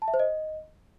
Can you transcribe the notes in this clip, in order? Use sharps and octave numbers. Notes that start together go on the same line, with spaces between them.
A5
E5
C5
D#5